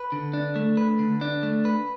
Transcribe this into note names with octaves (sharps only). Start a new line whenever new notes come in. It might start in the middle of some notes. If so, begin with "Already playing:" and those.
Already playing: B4
D3
D4
A3
B4
D3
D4
A3
B4